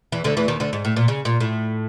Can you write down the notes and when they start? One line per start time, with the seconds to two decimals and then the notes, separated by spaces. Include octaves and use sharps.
0.12 E2 E3
0.24 D2 D3
0.37 E2 E3
0.48 D#2 D#3
0.60 D2 D3
0.73 G#2
0.85 A2
0.96 A#2
1.08 C#3
1.25 A#2
1.40 A2